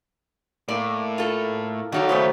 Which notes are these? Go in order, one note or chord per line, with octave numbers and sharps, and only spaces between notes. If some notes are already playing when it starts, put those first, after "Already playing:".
A2 A#3 D5
F4 A4
D#3 F#3 D4 D#4 A4 D5 F5
A2 C#3 A3 B3 C5 D5